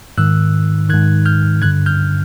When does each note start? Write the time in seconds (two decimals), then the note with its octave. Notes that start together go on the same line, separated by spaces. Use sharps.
0.18 G#2 D#3 E6 F#6
0.89 G#2 D#3 F#6 G#6
1.26 F6 G6
1.62 G2 D3 F#6 G#6
1.86 F6 G6